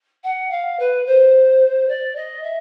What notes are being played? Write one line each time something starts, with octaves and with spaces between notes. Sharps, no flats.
F#5
F5
B4
C5
D5
D#5
E5